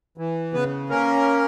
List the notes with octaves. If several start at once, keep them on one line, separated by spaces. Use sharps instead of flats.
E3
C#3 B3 B4
A#3 C#4 A#4